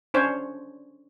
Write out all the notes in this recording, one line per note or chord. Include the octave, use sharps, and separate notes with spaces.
C#4 D4 C5 C#5